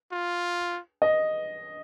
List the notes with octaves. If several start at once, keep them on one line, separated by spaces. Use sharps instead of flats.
F4
D#5